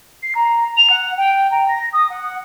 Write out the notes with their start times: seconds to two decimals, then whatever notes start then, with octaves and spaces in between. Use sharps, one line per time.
0.22 C7
0.35 A#5
0.76 F7
0.89 F#5
1.17 G5
1.51 A#5
1.68 A#6
1.92 D#6
2.09 F#5